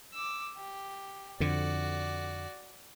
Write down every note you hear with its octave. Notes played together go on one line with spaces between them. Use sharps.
D6 E6
G4
F2 D3 F#4 D5